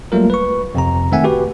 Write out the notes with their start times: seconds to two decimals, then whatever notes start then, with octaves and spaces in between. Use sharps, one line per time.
0.12 F#3 G3 A3 A#3 F4 A#4
0.30 B4 C#6
0.75 F2 C3 A#5
1.12 D#3 A3 C4 E5 F#5 G#5
1.24 F#4 G4 B4